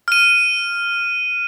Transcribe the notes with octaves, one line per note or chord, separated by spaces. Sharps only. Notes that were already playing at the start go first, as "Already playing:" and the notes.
F6 D#7